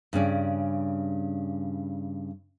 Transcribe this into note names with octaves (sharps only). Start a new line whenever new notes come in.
G2 C#3 C#4 D5